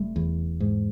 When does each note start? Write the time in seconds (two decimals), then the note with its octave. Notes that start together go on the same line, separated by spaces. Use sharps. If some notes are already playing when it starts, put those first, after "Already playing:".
Already playing: F1 G3 A3
0.16 E2
0.60 G#2